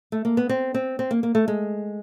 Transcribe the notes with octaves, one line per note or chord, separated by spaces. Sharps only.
A3
A#3
B3
C4
C4
C4
A#3
A#3
A3
G#3